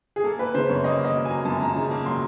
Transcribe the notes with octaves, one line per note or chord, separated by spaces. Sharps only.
G#4
A#3 A4
A#3 B4
C#3 C5
F#2 C#5
A#3 D#5
A#3
D#5
F#3
A#3 G#5
F#2 A5
F#2 A#5
C#3 A5
A#3
F#3 C6